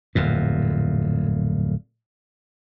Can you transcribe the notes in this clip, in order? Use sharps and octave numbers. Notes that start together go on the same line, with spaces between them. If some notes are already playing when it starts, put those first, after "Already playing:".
D1 F2 A#2